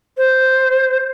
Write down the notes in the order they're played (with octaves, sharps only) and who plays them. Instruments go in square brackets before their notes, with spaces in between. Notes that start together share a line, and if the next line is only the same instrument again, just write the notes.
[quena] C5